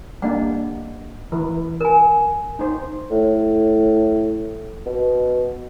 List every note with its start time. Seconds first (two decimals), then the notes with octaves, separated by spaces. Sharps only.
0.22 G3 A#3 D4 D#5 F#5
1.32 E3
1.81 A#4 G#5
2.59 D#4 C5
3.11 A2
4.86 B2